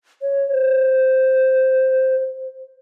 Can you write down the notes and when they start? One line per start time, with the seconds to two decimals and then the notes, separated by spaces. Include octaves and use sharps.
0.22 C#5
0.52 C5